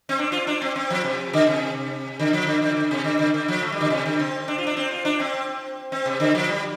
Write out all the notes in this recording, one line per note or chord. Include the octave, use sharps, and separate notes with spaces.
C4
D4
F4
D4
C4
C4
F3
C3
D3
C3
D3
F3
D3
D3
D3
C3
D3
D3
D3
F3
A3
G3
D3
C3
D3
C4
D4
F4
D4
C4
F4
D4
C4
C4
C3
D3
F3
G3